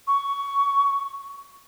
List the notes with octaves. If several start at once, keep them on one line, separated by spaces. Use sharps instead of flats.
C#6